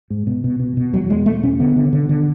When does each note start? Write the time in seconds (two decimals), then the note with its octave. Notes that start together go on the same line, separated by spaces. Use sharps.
0.10 G#2
0.27 B2
0.44 B2
0.60 B2
0.77 B2
0.93 E2 F#3
1.10 B2 G#3
1.26 E2 A3
1.43 B2 C#4
1.60 D3 B3
1.76 D3
1.93 D3
2.09 D3